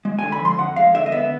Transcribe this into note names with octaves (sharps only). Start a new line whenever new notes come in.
G#3
G#5
D3
B5
F3 C6
F2 F#5
G#3 F5
D3 E5
D#5
B3 E5